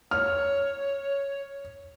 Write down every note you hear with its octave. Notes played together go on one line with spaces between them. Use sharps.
C#5 F6